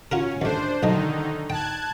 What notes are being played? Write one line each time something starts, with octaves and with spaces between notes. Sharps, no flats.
C#4 F4 F#4 A#4
D#2 A3 D4 C5
B1 D3 D#3 A3 D#4 D#5
G5 A5 F#6 G#6